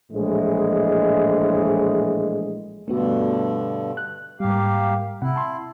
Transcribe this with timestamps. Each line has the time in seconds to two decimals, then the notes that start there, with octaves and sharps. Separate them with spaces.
0.12 A#1 A2 E3 G#3
2.88 G2 B2 D3 A3 B3 F#4
3.97 F#6
4.40 G#2 G3 A#3 G4 F5
5.22 C3 E4 F#5
5.36 A5 C6